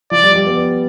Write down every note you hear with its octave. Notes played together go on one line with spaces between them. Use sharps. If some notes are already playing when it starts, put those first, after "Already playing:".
F3 D5
G3
G3
B3